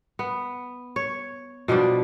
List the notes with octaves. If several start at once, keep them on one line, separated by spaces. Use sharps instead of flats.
B3
C#5
B2 F3 G3 D4